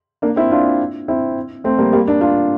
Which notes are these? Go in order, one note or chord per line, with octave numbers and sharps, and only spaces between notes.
A#3 D4
C4 E4
D4 F4
C4 E4
A3 C4
G3 A#3
G3 A#3
A#3 D4
D4 F4